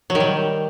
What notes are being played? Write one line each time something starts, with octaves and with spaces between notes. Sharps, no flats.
F#3
D#3
G3